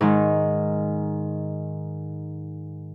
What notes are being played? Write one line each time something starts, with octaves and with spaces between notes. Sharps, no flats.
G#2 D#3